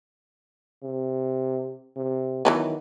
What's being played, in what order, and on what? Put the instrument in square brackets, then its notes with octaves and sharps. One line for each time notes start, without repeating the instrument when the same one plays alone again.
[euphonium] C3
C3
[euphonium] D#3 [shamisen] E3 F#3 B3